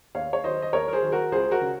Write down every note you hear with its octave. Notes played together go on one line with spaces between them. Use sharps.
D#2 C#5 F5
C#5
D#3 F#3 C5 D#5
D#5
D#2 A#4 C#5
A#4
G#4 C5
D#3 F#3
F#4 A#4
C#2 G#4 C5
F#4 A#4
C#3